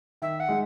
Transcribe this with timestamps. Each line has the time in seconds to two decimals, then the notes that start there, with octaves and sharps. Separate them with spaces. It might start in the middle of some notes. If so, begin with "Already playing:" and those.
0.22 D#3 E5
0.40 F#5
0.49 G#3 D#4